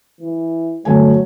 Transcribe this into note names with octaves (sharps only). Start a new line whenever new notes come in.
E3
G1 F#3 A3 G#5